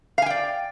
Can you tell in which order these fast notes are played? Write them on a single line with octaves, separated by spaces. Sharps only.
F5 G#5 G5 D5